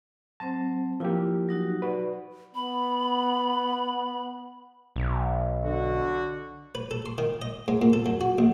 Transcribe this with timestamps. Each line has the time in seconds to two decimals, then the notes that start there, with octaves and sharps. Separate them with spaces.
0.40 F#3 C4 C5 A5
1.00 F3 A#3 E4 F4 G4
1.48 F#3 D#4 F#4
1.82 F#4 B4 D5
2.55 B3 B5
4.96 B1
5.63 D3 F#4
6.75 B4
6.91 A4
7.06 C6
7.18 D#3
7.42 D#5
7.68 G#2
7.82 A#2
7.93 A4
8.06 F#2
8.21 F#4
8.38 A#1